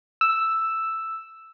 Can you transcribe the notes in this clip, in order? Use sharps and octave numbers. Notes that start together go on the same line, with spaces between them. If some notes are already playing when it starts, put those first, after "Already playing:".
E6